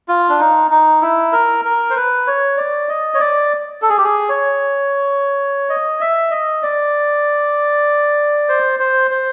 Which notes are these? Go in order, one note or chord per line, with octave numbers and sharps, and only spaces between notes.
F4
D4
D#4
D#4
E4
A#4
A#4
C5
B4
C#5
D5
D#5
C#5
D5
A4
G#4
G4
G#4
C#5
D#5
E5
D#5
D5
C5
C5
C5